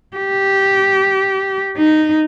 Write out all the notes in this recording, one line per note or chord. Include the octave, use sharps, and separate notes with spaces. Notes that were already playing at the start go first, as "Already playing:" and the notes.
G4
D#4